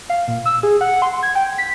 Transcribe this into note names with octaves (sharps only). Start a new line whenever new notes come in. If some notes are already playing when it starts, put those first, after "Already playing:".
F5
A#2
E6
G#4
F#5
C6
G#6
G5
B6